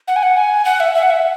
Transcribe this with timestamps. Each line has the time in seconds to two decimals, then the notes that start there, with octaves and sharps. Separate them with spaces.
0.08 F#5
0.16 G#5
0.23 F#5
0.36 G#5
0.65 F#5
0.80 E5
0.95 E5
1.03 F#5
1.10 E5